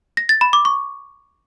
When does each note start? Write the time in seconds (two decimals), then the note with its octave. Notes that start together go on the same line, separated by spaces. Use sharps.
0.17 A#6
0.29 A6
0.41 B5
0.53 D6
0.65 C#6